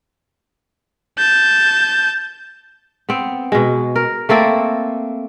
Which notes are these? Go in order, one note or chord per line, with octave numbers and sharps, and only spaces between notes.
A5 G6
B3 C4
B2 G#3
A#4
A3 A#3 C4 A4